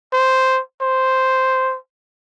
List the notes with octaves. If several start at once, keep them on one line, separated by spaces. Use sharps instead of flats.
C5
C5